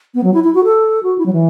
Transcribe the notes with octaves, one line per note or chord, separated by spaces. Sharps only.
B3
F#3
E4
E4
F#4
A4
F#4
E4
F#3
E3